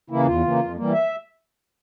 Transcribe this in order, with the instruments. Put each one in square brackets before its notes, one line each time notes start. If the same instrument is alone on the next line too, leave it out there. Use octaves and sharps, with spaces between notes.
[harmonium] C#3 E3 A#3 E4
E2 F4
C#3 E3 A#3
F2
E3 G3 A#3
E5